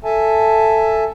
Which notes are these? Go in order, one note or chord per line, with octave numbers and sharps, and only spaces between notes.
A4 E5 G#5 A5